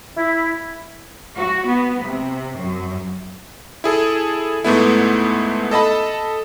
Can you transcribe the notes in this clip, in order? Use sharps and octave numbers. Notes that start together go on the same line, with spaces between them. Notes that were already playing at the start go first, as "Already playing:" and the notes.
E4
F#4
B3
C3
F#2
E4 G#4 A4
G#2 A3 B3 E4
A4 D#5 A5 B5